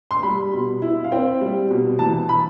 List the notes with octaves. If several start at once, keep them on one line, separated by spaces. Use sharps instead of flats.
C6
G3 B5
B2
E4
F5
C4 G5
G3
B2
E3 A5
B5